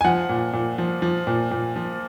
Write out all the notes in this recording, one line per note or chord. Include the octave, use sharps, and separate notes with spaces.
G#5
F3 F#5
A#2
A#2
F3
F3
A#2
A#2
F3